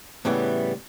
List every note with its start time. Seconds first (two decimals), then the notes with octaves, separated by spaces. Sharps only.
0.25 A2 C#3 E3 G3 B3